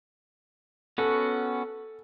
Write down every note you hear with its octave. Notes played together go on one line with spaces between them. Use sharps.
B3 C#4 F#4 A4